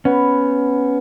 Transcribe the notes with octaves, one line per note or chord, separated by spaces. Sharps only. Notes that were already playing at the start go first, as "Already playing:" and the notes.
B3 C#4